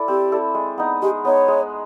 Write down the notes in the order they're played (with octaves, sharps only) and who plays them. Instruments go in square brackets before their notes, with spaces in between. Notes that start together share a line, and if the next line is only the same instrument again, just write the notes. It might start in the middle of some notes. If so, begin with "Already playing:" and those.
Already playing: [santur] E4 A4 D5
[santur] C4 [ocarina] G4
[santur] E4 A4 D5
G#3
B3 D#4
[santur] G#3 [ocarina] G4
[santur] B3 D#4 [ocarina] C#5
[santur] G#3